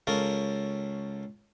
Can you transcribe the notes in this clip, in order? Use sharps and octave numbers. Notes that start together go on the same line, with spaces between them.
C#2 C#4 A4 A#4 F5